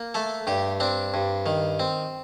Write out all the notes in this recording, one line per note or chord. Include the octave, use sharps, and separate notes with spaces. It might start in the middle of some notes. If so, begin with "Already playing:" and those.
Already playing: A#3
A3 A4
G2 G4
C4 D4
G2
D#3
C4